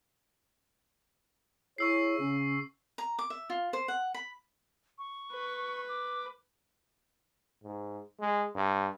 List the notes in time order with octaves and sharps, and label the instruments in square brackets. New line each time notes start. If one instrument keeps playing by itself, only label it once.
[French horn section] E4 G#4 C#5 [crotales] C#6 E6 C7
[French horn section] C#3 C#4
[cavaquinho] A#5
D6
E5
F4
C5
F#5
B5
[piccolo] C#6
[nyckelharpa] B4
[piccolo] D6
[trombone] G#2
G#3
G2